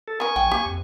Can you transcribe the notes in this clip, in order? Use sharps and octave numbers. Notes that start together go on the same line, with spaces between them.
A4
B3 A#4 G#5 C#6
A#1 G5
A#3 G4
F2